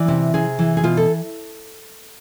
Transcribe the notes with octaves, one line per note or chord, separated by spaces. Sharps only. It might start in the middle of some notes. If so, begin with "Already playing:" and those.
Already playing: E3 D5
C3
C3 G#4
E3
G#4
B2 F4
A4